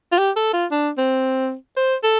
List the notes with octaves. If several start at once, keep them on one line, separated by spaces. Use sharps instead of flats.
F4
G4
A4
F4
D4
C4
C5
A4